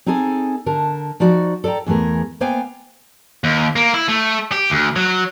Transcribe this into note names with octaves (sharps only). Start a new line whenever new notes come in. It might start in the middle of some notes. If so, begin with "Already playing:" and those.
C4 D#4 G#4 A4 G#5
D3 A#4 A5
F3 D#4 F#4 D5
A4 D5 E5 G5 A#5
E2 E3 A3 G#4 A#4
A#3 B3 C5 F5 G5 G#5
D#2
A#3
E4
A3
G4
D2
F#3